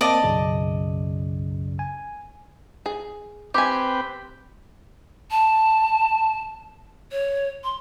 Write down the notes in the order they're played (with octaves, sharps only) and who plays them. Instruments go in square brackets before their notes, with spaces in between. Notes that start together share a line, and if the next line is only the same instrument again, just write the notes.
[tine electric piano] A#3 C4 D6 [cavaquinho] D5 D#5 A5
[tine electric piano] B1 F#2 C#3
G#5
[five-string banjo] G#4
[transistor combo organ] C4 B4 G5 [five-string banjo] G4 G#5
[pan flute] A5
C#5
C6